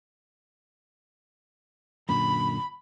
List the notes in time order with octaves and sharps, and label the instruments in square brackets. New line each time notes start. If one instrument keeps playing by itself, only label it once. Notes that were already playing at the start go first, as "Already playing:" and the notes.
[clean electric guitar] F#2 A#2 D3 [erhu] B5